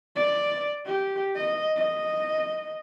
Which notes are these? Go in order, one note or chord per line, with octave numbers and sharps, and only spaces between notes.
D5
G4
D#5
D#5